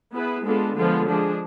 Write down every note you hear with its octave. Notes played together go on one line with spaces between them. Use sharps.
B3 E4 G#4 B4
G#3 B3 D4 F4 A4
D3 F3 G#3 B3 F4
F3 G#3 D4 G#4